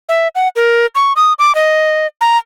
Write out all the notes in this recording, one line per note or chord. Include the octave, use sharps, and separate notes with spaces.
E5
F#5
A#4
C#6
D#6
D6
D#5
A#5